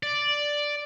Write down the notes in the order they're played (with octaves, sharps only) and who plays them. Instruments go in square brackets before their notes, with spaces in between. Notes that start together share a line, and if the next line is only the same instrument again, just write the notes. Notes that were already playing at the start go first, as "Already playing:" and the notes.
[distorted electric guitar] D5